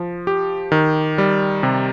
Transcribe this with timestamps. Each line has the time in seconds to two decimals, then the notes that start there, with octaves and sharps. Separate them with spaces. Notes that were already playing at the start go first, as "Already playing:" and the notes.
Already playing: F3
0.27 G4
0.72 D#3
1.18 G3
1.63 C3